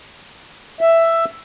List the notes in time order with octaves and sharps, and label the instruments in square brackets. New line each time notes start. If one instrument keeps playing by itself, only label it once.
[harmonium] E5